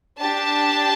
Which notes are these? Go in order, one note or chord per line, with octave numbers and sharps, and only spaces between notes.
D4 G4 A5